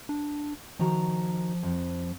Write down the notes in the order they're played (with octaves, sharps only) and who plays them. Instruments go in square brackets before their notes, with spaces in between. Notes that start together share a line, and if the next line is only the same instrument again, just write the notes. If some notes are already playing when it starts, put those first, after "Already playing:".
[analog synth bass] D4
[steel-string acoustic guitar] D#3 F#4 A#5 [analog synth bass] F3
[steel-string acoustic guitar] F2